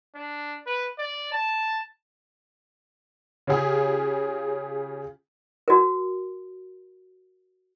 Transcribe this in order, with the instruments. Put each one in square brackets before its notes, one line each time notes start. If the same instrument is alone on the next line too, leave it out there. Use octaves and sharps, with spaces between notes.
[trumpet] D4
B4
D5
A5
[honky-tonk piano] C#3 C#4 F4 G4 G#4
[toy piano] F#4 A#4